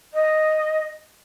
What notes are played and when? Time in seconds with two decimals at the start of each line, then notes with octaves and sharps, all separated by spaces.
0.14 D#5